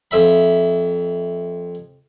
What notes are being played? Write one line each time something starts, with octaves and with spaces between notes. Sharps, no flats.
F2 E5 B5